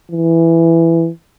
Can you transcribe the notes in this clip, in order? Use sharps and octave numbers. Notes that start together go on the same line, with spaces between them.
E3